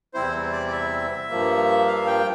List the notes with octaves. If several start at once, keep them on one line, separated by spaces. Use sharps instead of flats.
E2 C3 G3 C4 E4 C5
D5
D5
E5
G2 F3 A#3
F5
G5